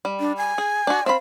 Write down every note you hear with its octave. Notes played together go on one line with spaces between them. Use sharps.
G3
D4
G#5
G#4
D4 F#4
C4 F5 B5